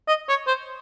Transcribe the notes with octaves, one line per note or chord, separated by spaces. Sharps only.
D#5
C#5
C5